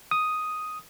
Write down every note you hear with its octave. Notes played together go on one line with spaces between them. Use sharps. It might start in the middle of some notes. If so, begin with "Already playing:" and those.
D#6